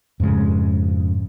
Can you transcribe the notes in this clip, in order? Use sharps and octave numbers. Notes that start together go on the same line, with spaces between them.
F2 G#2 C#3 G#3